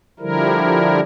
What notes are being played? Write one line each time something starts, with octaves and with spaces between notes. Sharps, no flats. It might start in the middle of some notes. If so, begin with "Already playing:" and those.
D3 F3 G3 E4 A#4